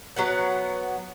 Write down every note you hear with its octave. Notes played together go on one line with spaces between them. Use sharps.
F#3 B3 F#5